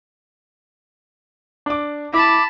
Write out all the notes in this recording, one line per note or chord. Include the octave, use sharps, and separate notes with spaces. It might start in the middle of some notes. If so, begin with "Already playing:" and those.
D4 D6
E4 A5 B5 D6